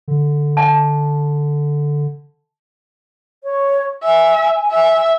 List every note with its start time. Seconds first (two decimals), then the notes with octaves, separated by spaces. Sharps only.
0.08 D3
0.57 A5
3.44 C#5
4.03 E5 G#5
4.72 E5